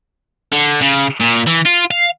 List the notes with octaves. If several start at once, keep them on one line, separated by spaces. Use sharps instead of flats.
D3
C#3
A#2
E3
F4
F5